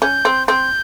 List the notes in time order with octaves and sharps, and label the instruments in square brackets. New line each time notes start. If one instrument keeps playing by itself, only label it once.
[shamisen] C#4 [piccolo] G6
[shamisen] C4
[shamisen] C4 [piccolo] G6